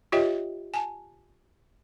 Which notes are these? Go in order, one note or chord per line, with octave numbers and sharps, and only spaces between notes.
F4 G4 C#5 D#5 E5 G5
G#5 A5